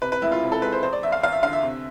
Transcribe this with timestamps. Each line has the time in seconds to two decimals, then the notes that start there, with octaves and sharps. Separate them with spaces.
0.02 C3 B4
0.12 B4
0.22 E1 E4
0.32 F4
0.42 C3
0.52 A4
0.62 G#3 B4
0.72 C5
0.83 E2 C5
0.93 D5
1.02 E2 E5
1.12 F5
1.23 E2 F5
1.32 E5
1.43 D3 F5
1.53 E5
1.63 C3